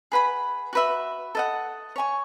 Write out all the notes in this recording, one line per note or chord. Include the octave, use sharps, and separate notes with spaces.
G#4 B4 F#5 B5
F#4 B4 E5
A4 D#5 F#5
C#5 G#5 C#6